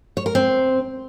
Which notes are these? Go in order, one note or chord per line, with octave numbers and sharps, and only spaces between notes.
C#5
A#4
C4